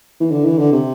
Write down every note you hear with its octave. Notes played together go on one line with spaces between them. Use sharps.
E3
D3
E3
D3
C3